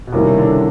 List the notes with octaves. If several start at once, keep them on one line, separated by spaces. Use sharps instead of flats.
B2
C3 D#3 G3 A#3 C#4 E4
D3